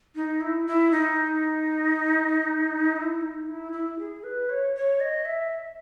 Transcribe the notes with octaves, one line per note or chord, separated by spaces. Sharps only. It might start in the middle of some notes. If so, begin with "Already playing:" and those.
D#4
E4
E4
D#4
E4
D#4
E4
E4
G#4
B4
C#5
C#5
D#5
E5